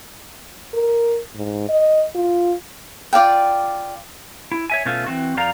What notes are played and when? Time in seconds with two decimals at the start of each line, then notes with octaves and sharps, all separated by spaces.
0.74 A#4
1.35 G#2
1.69 D#5
2.15 F4
3.13 F4 D5 F5 G5
4.52 E4
4.70 C#5 E5 G#5
4.85 B2 A3 C#4 F4
5.06 E3 C4 F#4
5.37 F2 F3 D5 F5 A#5